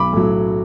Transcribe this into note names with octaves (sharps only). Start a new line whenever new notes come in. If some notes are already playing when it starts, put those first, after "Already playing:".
Already playing: B1 B5 D6
A2 F#3